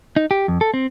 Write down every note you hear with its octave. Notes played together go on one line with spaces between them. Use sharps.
D#4
G4
F2
A4
C4